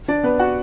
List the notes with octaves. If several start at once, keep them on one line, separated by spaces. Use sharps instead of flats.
D4 D5
B3 B4
F#4 F#5